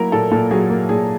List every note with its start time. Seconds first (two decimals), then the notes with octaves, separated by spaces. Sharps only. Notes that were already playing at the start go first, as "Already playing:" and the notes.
Already playing: F#3 A#3 E4 A#4
0.12 A#2 A4
0.31 A#2 A4
0.51 F#3 G#4
0.70 A#3
0.89 A#2 G#4